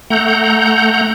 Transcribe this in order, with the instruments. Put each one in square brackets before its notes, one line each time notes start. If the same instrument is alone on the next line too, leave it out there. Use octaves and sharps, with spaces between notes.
[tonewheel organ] A3 F#5 A#5 G6